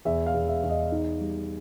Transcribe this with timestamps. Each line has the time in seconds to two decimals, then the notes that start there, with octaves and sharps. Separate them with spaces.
0.05 E2 E5
0.26 F5
0.34 E2
0.48 E5
0.63 E2
0.69 D#5
0.92 D#4
1.19 G3